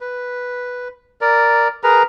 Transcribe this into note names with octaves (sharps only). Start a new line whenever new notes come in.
B4
A#4 D5
G#4 A#4 B4 A#5